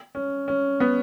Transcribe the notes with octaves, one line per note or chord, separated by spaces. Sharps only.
C#4
C#4
B3